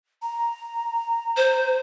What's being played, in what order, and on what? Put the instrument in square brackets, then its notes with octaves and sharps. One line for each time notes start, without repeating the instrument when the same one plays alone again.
[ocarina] A#5
[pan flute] C5